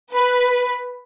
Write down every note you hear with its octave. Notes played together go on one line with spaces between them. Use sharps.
B4